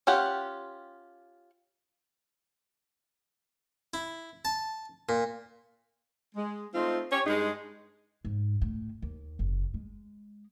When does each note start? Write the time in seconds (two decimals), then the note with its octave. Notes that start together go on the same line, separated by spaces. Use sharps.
0.07 C#4 F4 G4 F#5
3.94 E4
4.45 A5
5.09 A#2
6.35 G#3
6.74 A3 C4 D#4 F4
7.12 G4 C#5
7.27 G2 G#3 D#4 G#4
8.25 G#2
8.61 A2
9.02 D#2
9.39 F#1
9.74 G#3